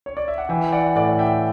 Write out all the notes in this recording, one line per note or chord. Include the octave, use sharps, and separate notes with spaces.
C#5
D5
E5
F#5
E3 E5 G5
D5 F#5
A2 D5 F#5
E5 G5